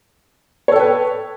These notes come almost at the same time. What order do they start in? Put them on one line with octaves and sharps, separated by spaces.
C#5 A4 G5 B4